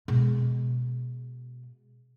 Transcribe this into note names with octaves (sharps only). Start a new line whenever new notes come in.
B2 G#3